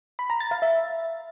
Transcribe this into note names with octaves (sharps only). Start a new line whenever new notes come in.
B5
A#5
A6
F5
E5